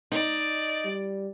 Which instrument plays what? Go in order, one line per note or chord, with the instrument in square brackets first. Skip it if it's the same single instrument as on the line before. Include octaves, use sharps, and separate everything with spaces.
[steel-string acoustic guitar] D#4 [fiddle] D5
[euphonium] G3